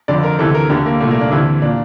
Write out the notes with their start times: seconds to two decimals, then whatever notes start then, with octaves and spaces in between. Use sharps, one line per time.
0.08 F2 D3 D5
0.23 A#4
0.39 D2 C3 E3 A4
0.55 A#4
0.70 D2 D3 G4
0.86 A#3
1.00 C2 A#2 A3
1.11 A#3
1.21 D4
1.31 D2 C3 E3 E4
1.62 A#2 D4